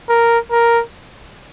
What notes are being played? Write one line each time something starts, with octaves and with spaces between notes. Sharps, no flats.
A#4
A#4